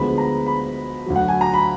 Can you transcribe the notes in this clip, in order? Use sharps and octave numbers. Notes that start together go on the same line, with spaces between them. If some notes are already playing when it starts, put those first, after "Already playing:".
Already playing: D2 D3 F3 G#3 B3 B5
A#5
B5
D2 D3 F#3
F#5
G#5
A#5
B5